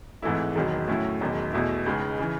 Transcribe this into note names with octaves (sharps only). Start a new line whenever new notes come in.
G#1 G#2 E3 A3 E4
E1 E2 D#3 F#3
A2 F#3 A3 C#4 E4
E1 E2 D#3 F#3
E2 B2 A3 E4
C#2 C#3 G#3 D#4
C#3 E3